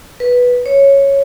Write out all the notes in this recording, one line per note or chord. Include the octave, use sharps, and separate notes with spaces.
B4
C#5